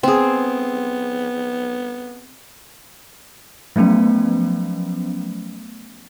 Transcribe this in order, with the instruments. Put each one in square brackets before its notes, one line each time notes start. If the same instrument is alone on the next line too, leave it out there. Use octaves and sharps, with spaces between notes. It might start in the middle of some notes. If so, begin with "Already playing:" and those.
[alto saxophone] B3 [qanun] C4 G#4
[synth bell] F3 F#3 A3 B3 C#4